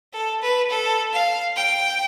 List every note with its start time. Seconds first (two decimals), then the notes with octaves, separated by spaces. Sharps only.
0.13 A4
0.42 B4
0.70 A4
1.13 F5
1.56 G5